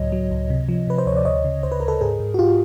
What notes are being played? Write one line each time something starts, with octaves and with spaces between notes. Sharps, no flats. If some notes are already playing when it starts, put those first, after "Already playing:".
Already playing: C#2 A2 F#3 C#5 D#5
F#3
C#2
C3
F3
C3 B4
C5
D2 C#5
D5
D2 C#5 D#5
C#3
D2 C5
B4
D2 A#4
A4 B4
G#2 G#4 A#4
G#2
F#4
G#2 F4 G4